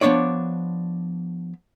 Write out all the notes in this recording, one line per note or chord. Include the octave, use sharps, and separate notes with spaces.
F3 B3 D4 C#5 D5